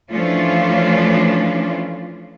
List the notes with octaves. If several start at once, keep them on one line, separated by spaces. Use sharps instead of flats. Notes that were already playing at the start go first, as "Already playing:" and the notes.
E3 F3 A3 C#4 D4 F4